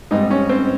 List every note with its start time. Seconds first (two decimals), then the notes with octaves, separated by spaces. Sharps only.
0.11 G#2 G3 C4 D#4
0.31 C#4
0.49 C4